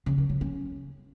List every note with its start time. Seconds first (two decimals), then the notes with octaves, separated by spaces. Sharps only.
0.06 C#3
0.18 D#3
0.29 F#3
0.41 C#4